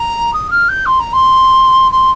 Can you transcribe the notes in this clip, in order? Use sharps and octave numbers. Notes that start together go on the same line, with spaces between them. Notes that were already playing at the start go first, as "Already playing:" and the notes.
Already playing: A#5
D#6
F6
G6
C6
A#5
C6
C6